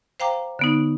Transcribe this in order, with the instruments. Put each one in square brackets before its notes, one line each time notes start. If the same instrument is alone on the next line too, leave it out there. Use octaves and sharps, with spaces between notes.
[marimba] C5 F5 G5 A#5 D6
D3 B3 D#4